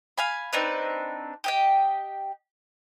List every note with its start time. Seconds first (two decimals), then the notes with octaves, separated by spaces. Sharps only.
0.18 F5 G#5 B5
0.53 C4 D4 D#4 B4
1.44 G4 D#5 G5